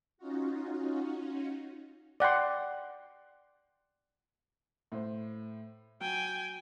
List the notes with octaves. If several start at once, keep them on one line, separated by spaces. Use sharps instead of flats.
C#4 D#4 F4 F#4
D5 F#5 G5 C6
A2 C5
F#3 G5 G#5